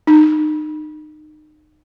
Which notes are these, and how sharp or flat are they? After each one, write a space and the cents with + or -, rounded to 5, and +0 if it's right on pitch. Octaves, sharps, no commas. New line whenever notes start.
D#4 -30